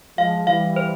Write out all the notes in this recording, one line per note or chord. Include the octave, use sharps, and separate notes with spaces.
F3 G#3 F5
E3 G3 F5
C5